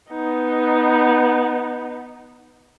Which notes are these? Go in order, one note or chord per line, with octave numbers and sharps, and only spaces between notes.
B3 D#4